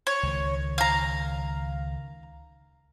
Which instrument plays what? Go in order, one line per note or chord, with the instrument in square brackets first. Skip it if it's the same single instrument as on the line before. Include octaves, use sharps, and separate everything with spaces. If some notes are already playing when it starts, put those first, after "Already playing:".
[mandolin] C#5
[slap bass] C#2 D#3
[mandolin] F5 A#5